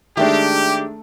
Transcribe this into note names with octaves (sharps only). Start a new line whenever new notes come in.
D#3 G#3 A3 D4 G4